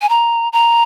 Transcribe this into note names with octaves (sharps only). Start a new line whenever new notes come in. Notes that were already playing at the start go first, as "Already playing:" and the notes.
G#5
A#5
A#5